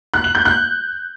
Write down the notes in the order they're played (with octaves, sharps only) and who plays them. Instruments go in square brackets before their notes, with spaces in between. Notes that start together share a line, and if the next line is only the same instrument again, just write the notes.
[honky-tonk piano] F#6
F#7
G6
F#6